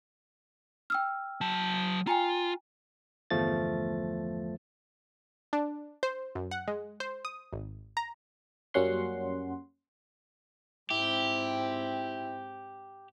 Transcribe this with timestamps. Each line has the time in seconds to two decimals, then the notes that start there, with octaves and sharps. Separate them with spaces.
0.90 G5 E6 F6
1.41 F#3 A5
2.07 F4 G5 G#5 A#5
3.30 G1 E2 F3 A3 A6
5.53 D4
6.03 C5
6.35 F#2
6.51 F#5
6.68 G#3
7.00 C5
7.25 D#6
7.53 G#1
7.97 A#5
8.74 F#2 G3 A#3 C#4 F#5 C6
10.91 G#2 C4 E4 G4